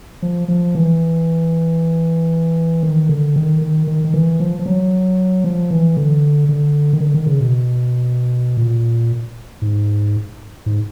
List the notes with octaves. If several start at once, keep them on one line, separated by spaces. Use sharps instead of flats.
F3
F3
E3
D#3
D3
D#3
D#3
D#3
D#3
E3
F3
F3
F#3
F3
E3
D3
D3
D#3
D3
D#3
C#3
B2
A#2
G#2
G#2